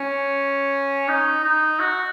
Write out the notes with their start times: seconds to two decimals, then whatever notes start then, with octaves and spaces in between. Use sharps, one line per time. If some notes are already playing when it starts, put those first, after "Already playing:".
Already playing: C#4
1.08 D#4
1.44 D#4
1.80 F#4